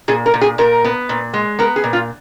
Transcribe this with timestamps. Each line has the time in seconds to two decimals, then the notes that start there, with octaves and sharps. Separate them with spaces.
0.08 A#2 G#4
0.26 A#4
0.34 A#2
0.41 G#4
0.58 A#2 A#4
0.84 B3
1.09 A#2
1.33 G#3
1.59 B3 A#4
1.76 G#4
1.84 A#2
1.93 F4